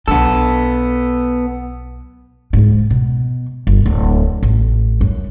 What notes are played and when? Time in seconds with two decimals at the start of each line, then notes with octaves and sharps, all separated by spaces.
0.08 B1 B3 D4 A4
2.53 G#2
2.90 B2
3.67 G1
3.86 D1
4.43 A1
5.01 F#2